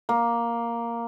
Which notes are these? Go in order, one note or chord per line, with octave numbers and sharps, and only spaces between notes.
A#3